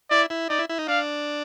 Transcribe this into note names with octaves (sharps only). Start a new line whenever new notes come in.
E4 D5
E4
D#4 D5
E4
E4
D#4
D4 F5